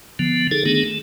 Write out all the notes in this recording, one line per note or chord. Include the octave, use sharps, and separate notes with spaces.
D3 F3 B3
D3 D#4 G#4 A4
D#3 A3 B3 D4 G#4
A3